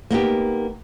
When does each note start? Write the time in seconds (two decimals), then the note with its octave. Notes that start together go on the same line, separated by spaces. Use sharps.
0.10 A#3 B3 D#4 G4